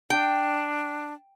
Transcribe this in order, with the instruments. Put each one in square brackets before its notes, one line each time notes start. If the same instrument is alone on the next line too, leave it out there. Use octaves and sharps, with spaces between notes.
[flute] D4 [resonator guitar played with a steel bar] G5